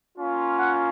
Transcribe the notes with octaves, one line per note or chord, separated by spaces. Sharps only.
A#3 C#4 F4
F#5